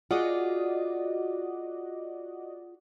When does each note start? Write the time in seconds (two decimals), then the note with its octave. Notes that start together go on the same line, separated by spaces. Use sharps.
0.11 F4 F#4 G#4 D5 D#5